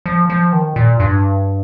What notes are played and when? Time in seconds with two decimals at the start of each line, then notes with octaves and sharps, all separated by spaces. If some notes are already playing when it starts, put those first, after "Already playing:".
0.06 F3
0.30 F3
0.53 D#3
0.76 A#2
1.00 G2